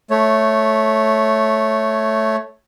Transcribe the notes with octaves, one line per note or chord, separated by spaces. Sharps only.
A3 C#5